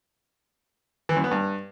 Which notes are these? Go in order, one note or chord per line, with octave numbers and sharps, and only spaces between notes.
E3
F#2
B3
G2